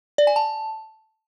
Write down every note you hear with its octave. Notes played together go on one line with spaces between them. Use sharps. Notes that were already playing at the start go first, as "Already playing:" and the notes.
D5
G#5
A5